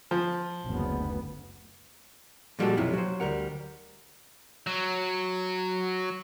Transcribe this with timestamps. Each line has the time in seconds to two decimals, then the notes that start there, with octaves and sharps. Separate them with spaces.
0.11 F3
0.66 F#1 D2 B3
2.59 A#2 F3 G3 G#3 F#4 A4
2.77 B1 F#2 C3 F3 E4
2.94 F#3 C5
3.20 D2 G3 A#4 F#5
4.67 F#3